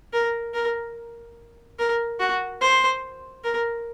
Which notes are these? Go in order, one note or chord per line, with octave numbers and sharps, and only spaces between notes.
A#4
A#4
A#4
F#4
C5
A#4